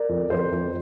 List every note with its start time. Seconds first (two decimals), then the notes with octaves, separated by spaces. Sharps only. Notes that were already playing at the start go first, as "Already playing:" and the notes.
Already playing: A#4 D5
0.09 F2
0.30 F2 C5
0.52 F2